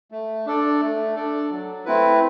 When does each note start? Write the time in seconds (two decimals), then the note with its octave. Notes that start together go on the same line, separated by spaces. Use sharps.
0.11 A3
0.46 D4 A4 D5
0.81 A3
1.15 D4 A4 D5
1.50 F#3
1.85 A3 C4 E4 B4